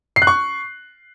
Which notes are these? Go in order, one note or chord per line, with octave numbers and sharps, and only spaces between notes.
C7
F#6
C#6